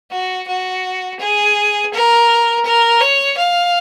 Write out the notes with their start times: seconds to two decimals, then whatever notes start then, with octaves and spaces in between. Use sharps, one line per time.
0.11 F#4
0.48 F#4
1.20 G#4
1.93 A#4
2.65 A#4
3.01 C#5
3.37 F5